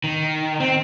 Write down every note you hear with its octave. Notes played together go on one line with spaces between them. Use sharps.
D#3
C4